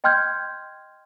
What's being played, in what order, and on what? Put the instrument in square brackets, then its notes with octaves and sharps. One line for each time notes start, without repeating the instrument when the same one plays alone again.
[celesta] D#5 G5 C6 F6 G6 G#6